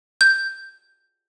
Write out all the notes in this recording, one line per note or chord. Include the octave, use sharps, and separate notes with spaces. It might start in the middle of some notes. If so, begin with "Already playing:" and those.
G6